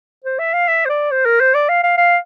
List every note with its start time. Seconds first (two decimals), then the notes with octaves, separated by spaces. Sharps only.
0.25 C5
0.39 E5
0.53 F5
0.68 E5
0.85 C5
0.89 D5
1.11 C5
1.25 A#4
1.40 C5
1.54 D5
1.69 F5
1.83 F5
1.98 F5